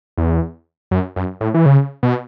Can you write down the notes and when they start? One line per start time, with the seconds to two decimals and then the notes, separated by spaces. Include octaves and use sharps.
0.17 E2
0.91 F#2
1.16 F#2
1.41 A2
1.54 E3
1.66 C#3
2.03 B2